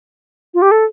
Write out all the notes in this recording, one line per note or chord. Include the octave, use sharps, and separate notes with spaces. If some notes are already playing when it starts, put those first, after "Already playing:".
F4
G4
A4